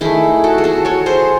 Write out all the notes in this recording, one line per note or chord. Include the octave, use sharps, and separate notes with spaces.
D#3 A3 E4 G#4
F#4 A4
G#4
F#4 A4
A4 C#5
G#4 C5